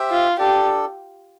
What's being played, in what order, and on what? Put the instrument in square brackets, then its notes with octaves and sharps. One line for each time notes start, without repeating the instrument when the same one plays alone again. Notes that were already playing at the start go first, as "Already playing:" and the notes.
Already playing: [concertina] G4 C5 E5 G5
[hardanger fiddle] F4
[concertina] D4 A4 D5 [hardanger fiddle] G4